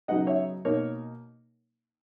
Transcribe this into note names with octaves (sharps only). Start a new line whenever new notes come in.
C#3 F#3 B3 D#4 D#5 F#5
C#5 E5
B2 A#3 D#4 A#4 C#5